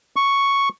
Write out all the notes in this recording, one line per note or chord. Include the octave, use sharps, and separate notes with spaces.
C#6